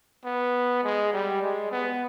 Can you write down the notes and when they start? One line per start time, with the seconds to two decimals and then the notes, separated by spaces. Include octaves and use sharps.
0.25 B3
0.84 G#3
1.13 G3
1.42 G#3
1.72 B3